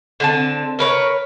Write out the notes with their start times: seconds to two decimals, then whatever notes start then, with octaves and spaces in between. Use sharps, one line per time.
0.20 D3 C4 A5
0.79 A#4 B4 C#5